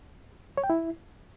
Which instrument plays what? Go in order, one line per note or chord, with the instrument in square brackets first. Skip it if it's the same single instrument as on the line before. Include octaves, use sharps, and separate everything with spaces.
[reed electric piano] C#5
G5
E4